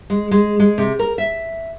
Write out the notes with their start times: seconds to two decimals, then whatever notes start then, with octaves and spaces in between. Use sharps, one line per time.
0.10 G#3
0.31 G#3
0.60 G#3
0.78 C3
0.99 A#4
1.18 E5